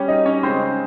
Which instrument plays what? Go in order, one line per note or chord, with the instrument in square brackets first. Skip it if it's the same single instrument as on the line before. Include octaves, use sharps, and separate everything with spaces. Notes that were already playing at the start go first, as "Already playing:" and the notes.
Already playing: [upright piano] G3 C#4 G4 C#5
D#4 D#5
C#4 C#5
C#3 G#3 C4 C5